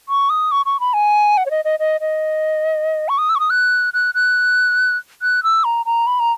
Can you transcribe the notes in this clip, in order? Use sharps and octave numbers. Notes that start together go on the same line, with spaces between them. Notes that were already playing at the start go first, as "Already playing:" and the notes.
C#6
D#6
C#6
C#6
B5
G#5
F#5
C#5
D#5
D#5
D#5
D#5
C#6
D#6
E6
C#6
D#6
F#6
F#6
F#6
F#6
E6
A#5
A#5
B5
A#5